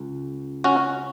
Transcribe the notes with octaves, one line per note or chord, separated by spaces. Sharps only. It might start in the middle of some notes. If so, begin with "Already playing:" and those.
Already playing: C#2
C#4 F#4